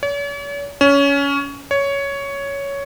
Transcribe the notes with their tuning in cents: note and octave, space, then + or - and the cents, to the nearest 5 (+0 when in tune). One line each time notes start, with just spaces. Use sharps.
C#5 +45
C#4 +20
C#5 +10